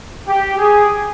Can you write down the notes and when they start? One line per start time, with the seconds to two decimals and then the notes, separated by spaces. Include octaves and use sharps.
0.26 G4
0.58 G#4